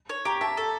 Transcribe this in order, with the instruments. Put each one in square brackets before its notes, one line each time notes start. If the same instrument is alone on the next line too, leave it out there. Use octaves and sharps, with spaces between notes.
[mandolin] C#5
[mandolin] G4 [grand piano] A#5
[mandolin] E5 [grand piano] A5
[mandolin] A4